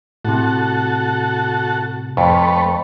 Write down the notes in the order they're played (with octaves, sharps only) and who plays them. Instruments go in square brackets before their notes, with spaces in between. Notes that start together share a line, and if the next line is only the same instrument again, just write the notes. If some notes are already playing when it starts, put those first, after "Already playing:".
[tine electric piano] A2 C3 [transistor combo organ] F#4 A4
[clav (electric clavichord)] F2 [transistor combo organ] A3 B4 C#5